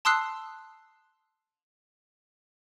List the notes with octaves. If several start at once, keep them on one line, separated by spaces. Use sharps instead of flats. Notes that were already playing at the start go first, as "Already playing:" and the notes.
A5 C6 D#6 E6 F#6 C7